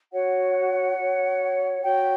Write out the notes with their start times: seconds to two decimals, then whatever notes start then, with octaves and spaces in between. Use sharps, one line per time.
0.11 F#4 C#5 F#5
0.97 F#4 C#5
1.82 F#4 C#5 G5